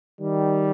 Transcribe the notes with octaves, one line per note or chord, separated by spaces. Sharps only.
D#3 G3